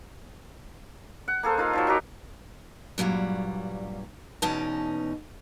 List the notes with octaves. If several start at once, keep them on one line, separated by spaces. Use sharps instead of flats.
F#5
A#3 G#4 A4 C5
D#4 F4 A#4
D#3 F3 F#3
F#3 F#4 G4
G2 A#2 F#3 G3
E2 B2 C#4 D#4 A5